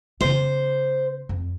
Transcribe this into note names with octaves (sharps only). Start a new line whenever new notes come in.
C#3 B3 C5
F2